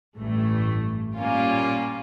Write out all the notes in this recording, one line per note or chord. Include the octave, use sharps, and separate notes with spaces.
A1 G2 E3 A3
A#2 G3 A#3 C#4 F4